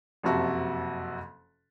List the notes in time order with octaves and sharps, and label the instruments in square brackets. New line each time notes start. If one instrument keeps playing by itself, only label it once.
[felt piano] F#1 F2 C3 F#4 E5 A5